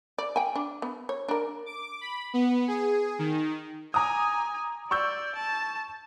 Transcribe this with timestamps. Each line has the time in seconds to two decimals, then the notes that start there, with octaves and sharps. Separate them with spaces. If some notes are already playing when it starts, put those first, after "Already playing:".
0.18 D5
0.36 G5 G#5
0.55 D4
0.82 B3
1.09 C#5
1.28 D4 A#4
1.66 D6
2.01 B5
2.34 B3
2.68 G#4
3.19 D#3
3.94 G#5 A#5 D6 D#6
4.91 D5 C#6 E6 G6
5.35 A5